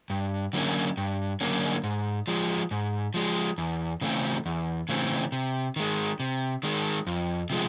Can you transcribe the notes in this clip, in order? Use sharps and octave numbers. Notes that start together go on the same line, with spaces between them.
G2
D3 F#3 A#3 C#4
G2
D3 F#3 A#3 C#4
G#2
F3 G#3
G#2
F3 G#3
E2
C#3 E3 A3 C4
E2
C#3 E3 A3 C4
C3
D#3 G#3
C3
D#3 G#3
F2
C3 F3 G#3